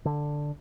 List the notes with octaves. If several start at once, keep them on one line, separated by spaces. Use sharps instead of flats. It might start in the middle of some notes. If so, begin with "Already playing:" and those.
D3